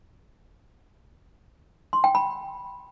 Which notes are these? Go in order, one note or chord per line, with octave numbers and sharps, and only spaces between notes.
C6
G5
B5